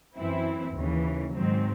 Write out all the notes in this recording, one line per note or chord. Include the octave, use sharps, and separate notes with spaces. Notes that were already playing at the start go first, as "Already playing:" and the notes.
F#2 E3 C4 E4
D#2 C#3 E3
G#2 D#3 F#3 C4